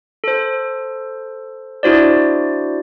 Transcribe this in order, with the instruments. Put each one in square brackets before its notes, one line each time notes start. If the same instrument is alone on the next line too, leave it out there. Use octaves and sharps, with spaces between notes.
[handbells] A4 C5
D4 E4 F#4 C5 D5